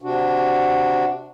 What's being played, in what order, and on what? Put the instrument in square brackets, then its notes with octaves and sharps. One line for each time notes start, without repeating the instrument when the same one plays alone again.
[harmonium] C3 D4 F#4